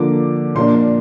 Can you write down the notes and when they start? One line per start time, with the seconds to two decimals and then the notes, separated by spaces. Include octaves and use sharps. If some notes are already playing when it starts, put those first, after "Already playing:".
Already playing: D3 F3 A#3 D6
0.55 A#2 F3 A#3 D4 C6